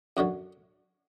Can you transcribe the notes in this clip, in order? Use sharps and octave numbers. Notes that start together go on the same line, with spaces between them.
F#2 D3 F#3 F#4